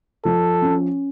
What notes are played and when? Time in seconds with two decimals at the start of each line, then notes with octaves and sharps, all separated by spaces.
0.24 F3 A4
0.62 C#4